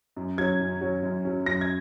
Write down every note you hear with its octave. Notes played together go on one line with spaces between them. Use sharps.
F#2
F#3 C#4 G#6
F#2
F#3 C#4
F#2
F#3 C#4
F#2 A#6
G#6